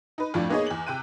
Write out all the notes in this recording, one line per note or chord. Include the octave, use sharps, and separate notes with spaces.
D#4 B4
F2 A2 F3 D4
A#3 B3 D#4 G#4 C#5 D#5
E2 F#7
C3 G5 F#6 D#7